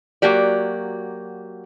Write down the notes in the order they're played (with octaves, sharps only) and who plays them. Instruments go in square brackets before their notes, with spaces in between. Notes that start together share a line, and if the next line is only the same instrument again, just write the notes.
[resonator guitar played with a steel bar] F#3 A#3 F#4 G4 D5